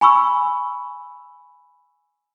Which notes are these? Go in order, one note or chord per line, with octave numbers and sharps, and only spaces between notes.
G#5 B5 C#6 E6